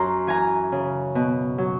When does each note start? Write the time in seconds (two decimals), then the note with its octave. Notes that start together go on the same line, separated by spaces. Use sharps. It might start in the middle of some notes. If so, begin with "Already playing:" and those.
Already playing: F#2 A#5 C6
0.27 E3 G#5 A#5
0.72 C#3
1.15 B2
1.58 F#3